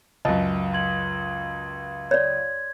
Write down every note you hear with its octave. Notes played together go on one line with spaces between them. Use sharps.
C#2 F#2 D#5 A5
C6 G#6 F#7
C#5 D5 G#6